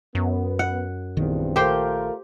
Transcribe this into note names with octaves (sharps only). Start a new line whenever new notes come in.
F#2 B3
F#5
A#1 E2 G2 D#3 C4
A3 F4 G4 A#4 C5